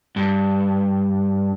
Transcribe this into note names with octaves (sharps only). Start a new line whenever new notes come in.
G2